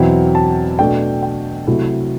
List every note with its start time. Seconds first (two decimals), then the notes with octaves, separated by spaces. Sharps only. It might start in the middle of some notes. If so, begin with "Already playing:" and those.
Already playing: E2 B2 F#3 C4 E4 G5
0.35 A5
0.79 B2 A3 D4 G5
1.23 G5
1.67 C3 F#3 A3 E4